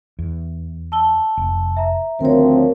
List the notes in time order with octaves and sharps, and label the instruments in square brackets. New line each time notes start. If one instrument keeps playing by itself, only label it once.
[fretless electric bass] E2
[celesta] A5 E6 G7
[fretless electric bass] F1
[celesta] E5 A#5
[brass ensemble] D2 F3 C4 [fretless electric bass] D#3 [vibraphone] A#4 C#5